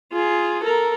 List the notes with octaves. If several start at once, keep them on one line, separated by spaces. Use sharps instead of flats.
F4 G#4
A4 A#4